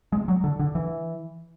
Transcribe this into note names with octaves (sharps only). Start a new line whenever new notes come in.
G#3
F#3
D3
D3
E3